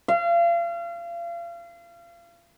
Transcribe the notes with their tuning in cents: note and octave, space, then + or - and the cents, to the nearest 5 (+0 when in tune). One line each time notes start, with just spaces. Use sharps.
F5 -35